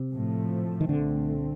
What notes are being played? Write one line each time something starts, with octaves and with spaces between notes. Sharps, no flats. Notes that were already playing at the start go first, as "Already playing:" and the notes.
Already playing: C3
A2 F3 A3
D#3
C2 A#2 D3 A3 C4